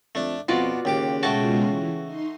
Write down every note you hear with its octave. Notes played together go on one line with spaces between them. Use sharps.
F2 A3 D4
F2 B2 F4 F#4 D5
D#2 C#3 G4 D6
B2 G#3 A3 F4 F#4 G5 A5
E3
D#4 C6